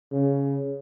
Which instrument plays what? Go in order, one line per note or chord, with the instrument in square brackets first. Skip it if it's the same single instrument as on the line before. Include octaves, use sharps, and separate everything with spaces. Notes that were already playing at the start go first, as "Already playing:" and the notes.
[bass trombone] C#3